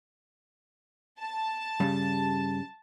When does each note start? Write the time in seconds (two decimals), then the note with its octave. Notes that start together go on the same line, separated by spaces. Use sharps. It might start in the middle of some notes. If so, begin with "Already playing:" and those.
1.19 A5
1.80 G2 C#3 G3